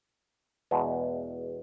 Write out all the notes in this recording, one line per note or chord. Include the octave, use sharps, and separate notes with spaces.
E2 B2 G#3